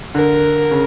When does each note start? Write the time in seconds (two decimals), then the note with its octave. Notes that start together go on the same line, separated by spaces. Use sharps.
0.15 D3 A#4
0.71 C#3